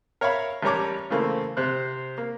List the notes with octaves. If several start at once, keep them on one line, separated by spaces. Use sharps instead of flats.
A#4 C#5 E5 F5 B5
A1 G3 A#4 C#5 A#5 D6
C#3 E3 A3 A#3 C4
C3 C4 C5 F#6
A#3